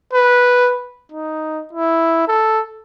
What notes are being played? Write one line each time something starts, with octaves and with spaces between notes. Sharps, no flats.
B4
D#4
E4
A4